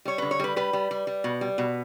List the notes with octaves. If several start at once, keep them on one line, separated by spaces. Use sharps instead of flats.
G3 C#5
D3 B4
C#5
G3 B4
G3 B4
G3
G3
G3
B2
G3
B2